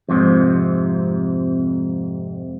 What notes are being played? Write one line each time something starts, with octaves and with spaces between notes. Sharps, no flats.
F2 G#2 C3